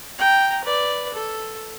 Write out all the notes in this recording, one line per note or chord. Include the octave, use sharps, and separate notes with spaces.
G5 A#5
B4 D5
A4